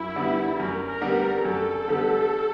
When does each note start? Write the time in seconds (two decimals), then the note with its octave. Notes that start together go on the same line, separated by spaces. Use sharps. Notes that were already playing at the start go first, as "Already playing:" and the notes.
Already playing: F#2 E4
0.16 D3 G3 B3
0.59 F#2 A#4
0.88 A#4
1.01 D3 G3 B3
1.16 A#4
1.45 F#2 A4
1.88 D3 G3 B3